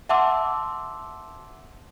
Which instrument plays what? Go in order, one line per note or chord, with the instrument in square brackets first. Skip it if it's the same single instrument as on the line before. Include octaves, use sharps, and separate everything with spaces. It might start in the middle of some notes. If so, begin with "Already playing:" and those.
[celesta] E5 F#5 A5 C6 D6 E6